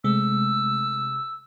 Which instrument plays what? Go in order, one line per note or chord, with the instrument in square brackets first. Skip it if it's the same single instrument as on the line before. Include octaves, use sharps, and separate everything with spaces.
[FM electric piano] C3 G#3 A3 [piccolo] E6